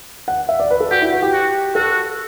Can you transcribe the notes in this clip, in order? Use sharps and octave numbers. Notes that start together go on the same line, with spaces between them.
F#5
E5
D5
B4
A4
F#4 G4
E4
F#4
G4
F#4
F#4 A4